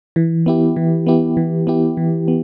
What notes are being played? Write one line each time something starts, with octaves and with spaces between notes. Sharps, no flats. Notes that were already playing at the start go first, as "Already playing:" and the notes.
E3
B3 E4 G4
E3
B3 E4 G4
E3
B3 E4 G4
E3
B3